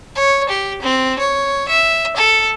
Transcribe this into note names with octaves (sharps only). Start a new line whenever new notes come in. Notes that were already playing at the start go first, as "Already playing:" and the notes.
C#5
G4
C4
C#5
E5
A4